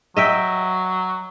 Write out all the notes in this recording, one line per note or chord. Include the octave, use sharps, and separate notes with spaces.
F#3 D#5 E5 G5